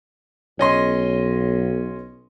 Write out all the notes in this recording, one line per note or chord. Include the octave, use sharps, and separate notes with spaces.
B1 C#4 D#5 C6